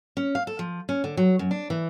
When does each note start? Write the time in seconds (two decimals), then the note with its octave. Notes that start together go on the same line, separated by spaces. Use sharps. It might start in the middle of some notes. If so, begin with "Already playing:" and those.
0.17 C#4
0.35 F5
0.47 A4
0.59 F3
0.89 C#4
1.04 D3
1.17 F#3
1.39 F#2
1.51 D4
1.70 E3